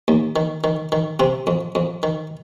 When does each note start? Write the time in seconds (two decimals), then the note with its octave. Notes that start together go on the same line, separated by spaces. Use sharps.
0.08 D#2
0.36 D#3
0.64 D#3
0.92 D#3
1.20 C3 C4
1.47 F2
1.75 F2
2.03 D#3